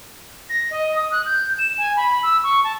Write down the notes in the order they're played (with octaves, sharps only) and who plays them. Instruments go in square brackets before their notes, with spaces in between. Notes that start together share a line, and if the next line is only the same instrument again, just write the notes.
[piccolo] A#6
D#5
D#6
F#6
G6
E7
G#5
B5
E6
C#6
A5